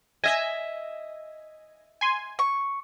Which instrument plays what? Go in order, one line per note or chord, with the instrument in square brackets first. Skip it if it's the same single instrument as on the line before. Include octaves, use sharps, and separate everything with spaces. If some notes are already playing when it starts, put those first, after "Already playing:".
[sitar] D#5 E5 [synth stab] G#5 A#6
[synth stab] G#5 C6
[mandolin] C#6